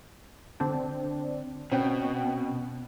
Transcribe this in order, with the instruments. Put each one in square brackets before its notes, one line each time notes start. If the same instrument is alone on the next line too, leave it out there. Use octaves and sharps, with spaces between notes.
[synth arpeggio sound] D3 C4 D4
[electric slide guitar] B2 [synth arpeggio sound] C4 C#4 G5